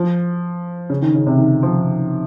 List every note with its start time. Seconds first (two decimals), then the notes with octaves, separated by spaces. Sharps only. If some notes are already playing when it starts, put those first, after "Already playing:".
Already playing: F3
0.90 C#3
1.02 D#3
1.14 C#3
1.27 C3
1.38 D#3
1.63 F3